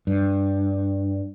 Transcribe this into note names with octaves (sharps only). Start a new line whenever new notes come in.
G2